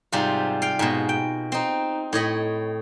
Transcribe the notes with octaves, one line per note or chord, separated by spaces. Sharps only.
G#2 C3 G3 F4
F5 G5
G#2 B2
G5
C4 D#4
A2 C#5 D#5 B5